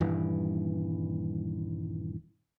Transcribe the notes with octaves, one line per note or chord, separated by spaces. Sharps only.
D#1 G2 E3